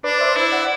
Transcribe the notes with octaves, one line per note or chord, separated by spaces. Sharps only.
D4 B4 D5
C5 E5
E4
D5 F#5